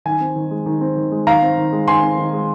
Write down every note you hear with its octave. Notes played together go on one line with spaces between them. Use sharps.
D#3 G#5
C4
D#3
G#3
D#3
C4
D#3
G#3
D#3 F5 A#5
C4
D#3
G#3
D#3 G#5 C6
C4
D#3
G#3